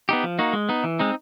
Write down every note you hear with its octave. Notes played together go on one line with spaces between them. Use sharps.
B3 D#4 G4
F3
A#3 D#4 F#4
G#3
B3 D#4
E3
G#3 C4 D#4